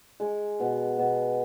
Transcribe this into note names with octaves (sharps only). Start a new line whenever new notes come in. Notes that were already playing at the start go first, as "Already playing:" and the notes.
G#3
B2
B2